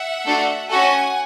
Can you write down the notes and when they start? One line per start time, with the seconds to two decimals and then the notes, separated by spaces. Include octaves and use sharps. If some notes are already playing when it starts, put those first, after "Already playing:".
Already playing: E5 F#5
0.26 A3 D4 F#4 A4
0.69 C#4 F#4 A4 F#5 G#5